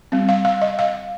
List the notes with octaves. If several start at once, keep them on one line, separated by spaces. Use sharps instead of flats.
G3 C4
F5
F5
D#5
F5